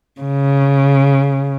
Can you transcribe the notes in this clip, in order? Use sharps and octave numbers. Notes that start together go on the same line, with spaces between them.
C#3